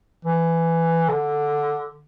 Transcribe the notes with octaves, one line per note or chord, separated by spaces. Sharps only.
E3
D3